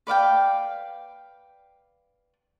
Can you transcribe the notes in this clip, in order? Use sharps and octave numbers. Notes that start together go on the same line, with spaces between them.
B4 D5 F5 G5